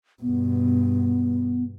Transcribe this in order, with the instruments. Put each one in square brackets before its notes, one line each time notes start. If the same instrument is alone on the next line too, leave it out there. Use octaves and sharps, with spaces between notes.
[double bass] G2 B2 [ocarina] B3